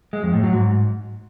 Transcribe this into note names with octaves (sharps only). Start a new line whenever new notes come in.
G#3
F2
A2
F#3
G#2